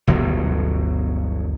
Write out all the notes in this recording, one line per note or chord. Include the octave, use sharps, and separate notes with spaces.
G1 D2 B2 F#3